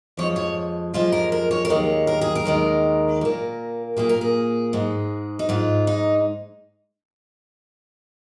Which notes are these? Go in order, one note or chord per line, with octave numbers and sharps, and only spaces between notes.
F2 F3 G#3 C#5
C#5
F2 F3 G#3 F4
A#4
A#4
C#5
A#4
D#2 D#3 G#3 C#5
A#4
G#4
A#4
D#2 D#3 G#3
A#2 A#3
A#2 A#3 G#4
A#4
G#4
G#2 G#3
D#4
G#2 G#3 F4
D#4